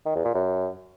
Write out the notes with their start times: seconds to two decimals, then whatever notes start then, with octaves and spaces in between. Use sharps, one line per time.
0.06 D#3
0.15 E2
0.25 A#2
0.34 F#2